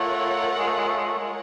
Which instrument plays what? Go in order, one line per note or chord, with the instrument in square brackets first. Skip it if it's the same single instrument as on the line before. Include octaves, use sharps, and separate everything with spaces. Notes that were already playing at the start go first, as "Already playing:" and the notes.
Already playing: [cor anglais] A3 [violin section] F4 A#4 C#5 F#5
[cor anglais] G#3
A3
G#3
A3
G#3
A3
G#3